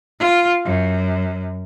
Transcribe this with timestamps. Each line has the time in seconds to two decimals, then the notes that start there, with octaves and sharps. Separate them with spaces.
0.20 F4
0.65 F#2